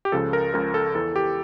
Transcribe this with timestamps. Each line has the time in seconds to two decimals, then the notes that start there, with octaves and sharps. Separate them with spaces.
0.05 G4
0.12 C#2 C#3 F3 A4
0.33 A#4
0.54 C#2 C#3 F3 A#4
0.74 A4
0.95 E2 E3 A4
1.16 G4